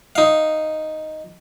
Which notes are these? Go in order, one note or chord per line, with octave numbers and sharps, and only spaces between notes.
D#4 F5